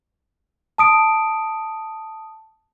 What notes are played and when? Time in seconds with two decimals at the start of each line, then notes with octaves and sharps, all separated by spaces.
0.78 A5 D#6 D7